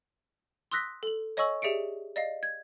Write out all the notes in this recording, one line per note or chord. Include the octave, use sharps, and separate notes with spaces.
C6 D#6 E6 F#6 A#6 B6
A4 F#7
C#5 D#5 G#5 C#6 E6 F#7
G4 G#4 D5 E5 C#7 D7
D5 D#5 F5
G#6